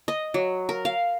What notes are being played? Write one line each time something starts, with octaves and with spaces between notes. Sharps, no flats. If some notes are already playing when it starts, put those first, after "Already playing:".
D#5
F#3
A#4
F5